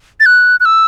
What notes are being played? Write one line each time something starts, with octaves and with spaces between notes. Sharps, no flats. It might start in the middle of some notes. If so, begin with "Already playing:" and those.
A6
F#6
F#6
E6